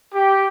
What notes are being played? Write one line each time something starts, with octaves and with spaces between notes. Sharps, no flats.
G4